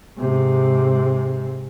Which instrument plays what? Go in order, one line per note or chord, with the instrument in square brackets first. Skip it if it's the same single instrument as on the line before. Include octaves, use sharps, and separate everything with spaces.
[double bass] G#2 C3